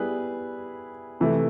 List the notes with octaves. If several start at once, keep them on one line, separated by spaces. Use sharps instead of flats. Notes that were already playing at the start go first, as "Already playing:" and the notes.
Already playing: G3 B3 E4 G#4 B4
C3 E3 A3